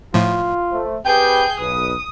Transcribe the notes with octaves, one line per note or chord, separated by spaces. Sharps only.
A2 F3 F4
A3 C5
C4 G4 G#4 B4 G5 G6
B1 B4 D#6